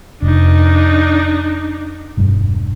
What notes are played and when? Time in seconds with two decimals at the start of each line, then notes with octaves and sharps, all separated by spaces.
0.22 F1 D4 D#4
2.17 E1 G2